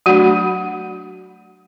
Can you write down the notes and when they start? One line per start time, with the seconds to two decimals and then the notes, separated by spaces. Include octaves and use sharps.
0.06 F#3 A3 D4 F#4 F#5